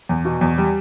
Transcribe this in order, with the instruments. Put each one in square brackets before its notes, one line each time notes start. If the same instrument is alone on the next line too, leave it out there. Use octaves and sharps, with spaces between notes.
[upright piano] E2
B2
E2
G3